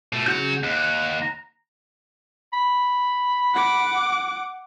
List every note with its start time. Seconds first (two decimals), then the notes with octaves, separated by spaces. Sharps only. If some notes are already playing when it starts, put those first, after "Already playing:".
0.13 B2 A3
0.26 C#3 F#3 F4 F#4 G6
0.63 D#2 F#5
1.22 A#5
2.53 B5
3.54 F#5 D6